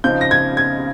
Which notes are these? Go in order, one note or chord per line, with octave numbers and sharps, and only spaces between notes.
C#3 F3 C4 D#4 G6
A#6
G#6
G#6